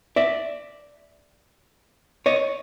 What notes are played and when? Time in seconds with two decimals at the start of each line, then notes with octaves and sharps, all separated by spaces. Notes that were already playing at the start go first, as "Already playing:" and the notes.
0.16 D5 E5
2.26 C#5 D#5